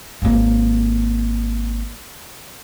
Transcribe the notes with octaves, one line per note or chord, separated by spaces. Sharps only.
G#1 A#3